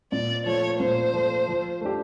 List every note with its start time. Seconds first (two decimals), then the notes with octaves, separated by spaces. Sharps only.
0.12 A#2 D5
0.46 F3 A3 C#5
0.80 A#2 C5
1.14 F3 A3
1.48 F3
1.81 A3 D4 G4